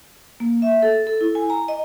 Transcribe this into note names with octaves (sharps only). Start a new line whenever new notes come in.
A#3
E5
A4
A4
E4
G#5
A#5
D#5